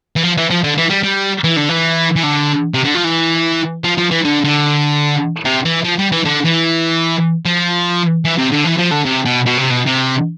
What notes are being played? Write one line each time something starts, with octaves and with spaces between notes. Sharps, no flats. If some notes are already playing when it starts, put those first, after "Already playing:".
E3
F3
E3
F3
D3
E3
G3
G3
E3
D3
E3
E3
D3
C3
D3
F3
E3
F3
F3
E3
D3
D3
C3
E3
F3
G3
E3
D3
E3
F3
E3
C3
D3
E3
F3
D3
C3
B2
B2
C3
B2
C3